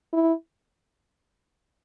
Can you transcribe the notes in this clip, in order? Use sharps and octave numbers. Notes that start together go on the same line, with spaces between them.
E4